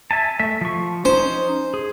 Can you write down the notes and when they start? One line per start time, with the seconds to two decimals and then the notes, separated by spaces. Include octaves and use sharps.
0.11 E5 G#5 A5
0.39 A3 E5
0.61 F3 C#6
1.05 C#4 D#4 C5
1.74 G#4